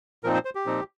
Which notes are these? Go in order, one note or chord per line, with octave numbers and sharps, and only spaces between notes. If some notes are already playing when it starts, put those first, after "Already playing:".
A#2 F3 C4 D#4 A#4
C5
C5
G4
A#2 F3 C4 D#4